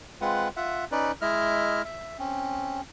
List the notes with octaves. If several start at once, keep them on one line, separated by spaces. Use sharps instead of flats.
G#3 C4 F4 B4 F#5
F4 E5 F#5
C#4 D#4 B4 D5
G#3 E4 D#5 E5 F6
E5
C4 C#4